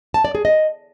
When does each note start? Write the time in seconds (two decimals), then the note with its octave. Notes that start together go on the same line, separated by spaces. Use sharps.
0.14 A5
0.25 D5
0.35 G#4
0.45 D#5